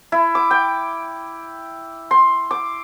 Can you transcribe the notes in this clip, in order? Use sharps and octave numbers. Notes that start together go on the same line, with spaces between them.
E4
D6
G5
C6
D6